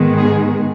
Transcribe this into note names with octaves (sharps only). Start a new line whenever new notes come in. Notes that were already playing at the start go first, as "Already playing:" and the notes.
Already playing: G#2 D#3 G#3 B3
G#4